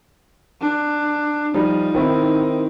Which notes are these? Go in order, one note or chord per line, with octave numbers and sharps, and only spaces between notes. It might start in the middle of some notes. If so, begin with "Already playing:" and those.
D4
F3 G3 D#4
D#3 C4 E4